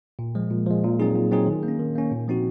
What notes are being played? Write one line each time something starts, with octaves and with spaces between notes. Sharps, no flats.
A#2
F3 G#3
A#2
F3 G#3
A#2
F#3 C4 D#4 G#4
A#2
F#3 C4 D#4 G#4
D#3
A#3
C#4
D#3
A#3 C#4
A#2
F3 C4 D#4 F#4